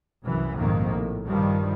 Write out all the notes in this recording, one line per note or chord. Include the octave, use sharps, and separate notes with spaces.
C2 F#2 E3
A#1 F2 G#2 C3 D#3 A#3
A2
G2 D#3 F3 G3